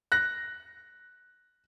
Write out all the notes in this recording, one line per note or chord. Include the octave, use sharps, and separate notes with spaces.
F#6 A#6